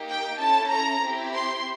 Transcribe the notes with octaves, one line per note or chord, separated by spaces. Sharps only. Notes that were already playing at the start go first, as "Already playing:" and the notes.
Already playing: A#3 D#4 G4
G5
C#4 E4 A4 A5
A#5
C4 E4 G4
C6